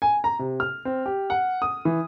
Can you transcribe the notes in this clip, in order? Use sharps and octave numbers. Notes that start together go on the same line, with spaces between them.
G#5
A#5
C3
F6
C4
G4
F#5
D#6
E3